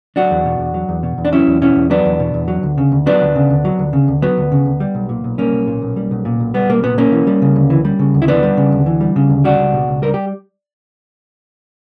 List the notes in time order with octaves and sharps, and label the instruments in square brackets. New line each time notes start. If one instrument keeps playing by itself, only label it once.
[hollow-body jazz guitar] F#3 D4 F#4
E2
B2
E2
F#3
E2
B2
E2
D4
F#3 C#4 E4
E2
B2 C#4 E4
E2
F#3 B3 D4
E2
B2
E2
F#3
D2
C#3
D2
F#3 B3 D4
D2
C#3
D2
F#3
D2
C#3
D2
F#3 B3
D2
C#3
D2
G3
B1
A#2
B1
G3 A#3 C#4
B1
A#2
B1
G3
B1
A#2
B1
G3 B3
B1 A#3
A#2 B3
B1 A#3 C#4
E3
G3
C#3
D2
E3
G3
C#3
D2
E4
E3 B3 D4
G3
C#3
D2
E3
G3
C#3
D2
G3 D4 F#4
C#2
B2
C#2
G3 A#4
G4